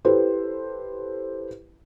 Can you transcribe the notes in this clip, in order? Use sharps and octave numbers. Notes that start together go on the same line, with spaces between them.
E4 G4 A4 B4 C5